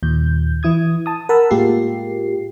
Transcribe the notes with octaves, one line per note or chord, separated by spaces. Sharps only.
D#2 A#2 G6
E3 E4 D#6 G#6
A5 D#6
A#4 F#5 A5 B5 E6
A2 G#3 A#3 F4 G4 C7